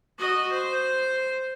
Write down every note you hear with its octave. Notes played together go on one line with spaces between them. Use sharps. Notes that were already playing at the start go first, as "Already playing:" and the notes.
F#4 D#5
C5